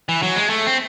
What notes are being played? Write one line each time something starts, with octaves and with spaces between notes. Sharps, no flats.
E3
F#3
G#3
A3
C4